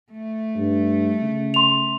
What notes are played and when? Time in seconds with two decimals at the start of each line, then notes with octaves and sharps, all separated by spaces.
0.12 A3
0.56 G2
1.22 C#3
1.54 C6 F7